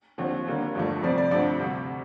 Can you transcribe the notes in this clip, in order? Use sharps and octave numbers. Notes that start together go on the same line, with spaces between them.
D#2 D3 F3 C4
D#2 D3 G3 A#3
G1 G2 F3 A3
F2 C3 G3 C4 D5
D5
G2 D3 F3 A3 C4 D5
D2 C3 G3